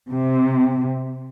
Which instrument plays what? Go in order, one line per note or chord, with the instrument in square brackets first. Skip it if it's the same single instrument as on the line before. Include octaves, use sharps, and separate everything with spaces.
[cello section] C3